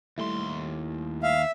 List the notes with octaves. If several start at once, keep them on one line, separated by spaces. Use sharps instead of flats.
D#2 G3 A3 E4 C6
E5 F5